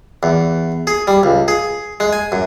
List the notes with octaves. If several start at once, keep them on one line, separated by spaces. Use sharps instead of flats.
E2
G#4
G3
C#2
G#4
G#3
G#5
F#2